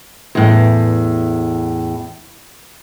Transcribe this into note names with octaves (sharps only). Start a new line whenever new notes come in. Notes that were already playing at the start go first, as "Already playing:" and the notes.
E2 A2